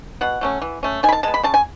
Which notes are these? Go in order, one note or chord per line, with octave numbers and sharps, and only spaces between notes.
B2 F#5
F#3 A3 C#4
E3
A3 C#4
D#3 G#5
B5
A5
G#3 B3 A5
B5
C#3 A5
G#5